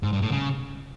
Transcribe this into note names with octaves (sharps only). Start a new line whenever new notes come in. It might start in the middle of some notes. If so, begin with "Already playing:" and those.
G#2
G2
A2
C#3